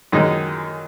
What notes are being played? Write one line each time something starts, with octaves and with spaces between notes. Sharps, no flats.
F#2 D#3 G#3 D#4